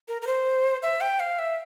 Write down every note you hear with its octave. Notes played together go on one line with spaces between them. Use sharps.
A#4
A#4
C5
E5
G5
F5
E5